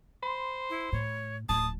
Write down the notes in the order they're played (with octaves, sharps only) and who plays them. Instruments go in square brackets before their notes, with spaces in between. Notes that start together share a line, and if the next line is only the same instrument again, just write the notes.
[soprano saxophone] C5 [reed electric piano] B5 C6
[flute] E4
[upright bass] A2 [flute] C#5
[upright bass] D1 F3 [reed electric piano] A2 [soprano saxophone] A5 [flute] D#6